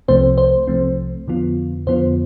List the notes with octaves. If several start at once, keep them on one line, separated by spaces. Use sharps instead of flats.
C2 C3 F3 A3 C4 C5
C5
C2 C3 F3 A3 C4
F2 D3 F3 B3 F4
F2 D3 F3 B3 F4 C5